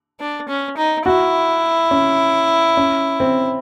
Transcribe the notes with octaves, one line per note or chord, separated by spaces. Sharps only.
D4
C#4
D#4
E4 F#4
C#4
C#4
C4